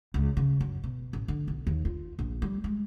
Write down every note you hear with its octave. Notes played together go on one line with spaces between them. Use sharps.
C#2
C#3
F#2
B2
A1
D3
B1
D#2
F4
A#1
G3
G#3